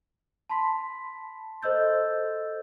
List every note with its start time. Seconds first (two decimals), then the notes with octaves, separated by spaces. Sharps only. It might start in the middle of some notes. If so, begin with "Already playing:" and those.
0.49 A5 B5 C6 B6
1.62 A4 C5 D#5 E6 G6 A6